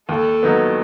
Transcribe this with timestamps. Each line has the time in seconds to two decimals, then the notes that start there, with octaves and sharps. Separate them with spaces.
0.09 D#2 A4
0.43 D#3 F#3 B3